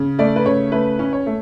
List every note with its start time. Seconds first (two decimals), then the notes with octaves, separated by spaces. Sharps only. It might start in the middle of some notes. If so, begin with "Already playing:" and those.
Already playing: C#3
0.19 A3 D5
0.36 B4
0.45 C#3 C#5
0.72 A3 B4
0.99 C#4
1.13 C#5
1.26 A3